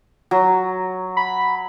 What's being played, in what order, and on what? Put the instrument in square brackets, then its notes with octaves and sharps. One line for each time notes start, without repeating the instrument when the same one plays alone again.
[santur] F#3
[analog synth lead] B5